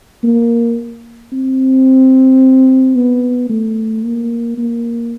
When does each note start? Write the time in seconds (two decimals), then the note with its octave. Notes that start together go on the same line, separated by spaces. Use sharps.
0.24 A#3
1.32 C4
2.95 B3
3.49 A3
4.04 A#3
4.58 A#3